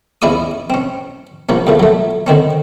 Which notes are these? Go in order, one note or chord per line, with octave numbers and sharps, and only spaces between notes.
E2 C#4 E4 D5 C#6 D#6
C4 C#4
A#1 F3 A#3 C#4
E2 A#2 A3
F#3 A3
D3 D#3 C4 C#4